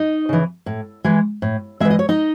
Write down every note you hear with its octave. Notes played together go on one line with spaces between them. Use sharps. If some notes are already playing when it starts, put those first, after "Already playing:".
Already playing: D#4 D#5
C#3 E3
A2
E3 G#3
A2
E3 G#3 E5
D#5
C#5
D#4 D#5